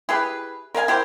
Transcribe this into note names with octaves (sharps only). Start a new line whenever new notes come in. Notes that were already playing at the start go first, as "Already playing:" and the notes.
E4 G4 G#4 B4
A#4 D#5 F5 G#5
E4 G4 A#4 C5